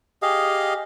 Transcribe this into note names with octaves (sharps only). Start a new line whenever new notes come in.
G4 G#4 D#5 F5